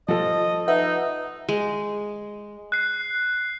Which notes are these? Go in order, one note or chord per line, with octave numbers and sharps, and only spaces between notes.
F3 A4 D#5
D#4 B4 E5 F#5
G#3
F#6 C7